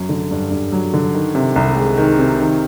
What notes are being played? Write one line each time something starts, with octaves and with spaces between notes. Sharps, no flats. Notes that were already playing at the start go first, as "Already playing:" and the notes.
Already playing: F#2 F#3
D3
G2
G2
F#3
D3
D#3
C3
C2
G#3
D#3
C3
D#3